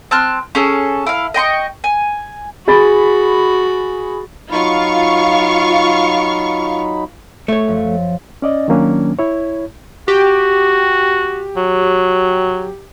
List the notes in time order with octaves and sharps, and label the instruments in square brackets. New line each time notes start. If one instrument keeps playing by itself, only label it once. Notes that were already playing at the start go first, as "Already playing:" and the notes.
[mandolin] C4 A5 F6 F#6
C#4 G#4 A4
E4 F5
D#5 G5 C6 C#6
G#5
[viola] F#4 [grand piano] G#4 B5 A6
[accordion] F#3 D#4 B5 [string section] F4 F5 C#6
[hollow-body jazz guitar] A3 C#5
[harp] F#2 F3
[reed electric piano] C#4 D5 D#5
D#3 F#3 A#3 C#4 D4
E4 C#5
[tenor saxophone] F#4 [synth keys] G4
[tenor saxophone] F#3